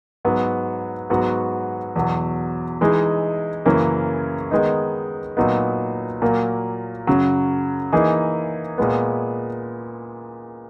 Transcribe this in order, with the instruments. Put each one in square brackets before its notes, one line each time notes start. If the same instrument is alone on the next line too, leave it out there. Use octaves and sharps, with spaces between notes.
[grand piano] G#2 F#3 B3
G#2 F#3 B3 F#4
E2 B2 F#3
E3 G#3 D#4 G#4
F#2 C#3 E3 A#3 C#4
D#3 G#3 B3 D#4
A#2 F#3 B3 D#4
A#2 F#3 A#3
F#2 C#3 F#3
E3 A#3 D#4 G#4
A#2 G#3 B3